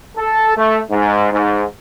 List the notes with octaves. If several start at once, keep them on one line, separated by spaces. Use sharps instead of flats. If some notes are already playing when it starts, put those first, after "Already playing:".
A4
A3
G#2
G#2